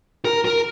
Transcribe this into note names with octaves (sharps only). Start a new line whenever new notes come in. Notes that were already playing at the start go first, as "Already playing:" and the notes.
A#4
A#4